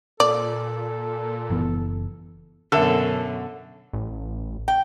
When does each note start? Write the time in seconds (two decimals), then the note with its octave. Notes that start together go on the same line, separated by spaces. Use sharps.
0.20 A#2 A4 D5
1.50 F#1 E3 B3
2.72 F#2 B2 D3 A4 A#4 E5
3.93 A1
4.68 G5